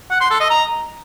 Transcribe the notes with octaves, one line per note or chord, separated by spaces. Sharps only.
F#5
C6
A4
D#5
A#5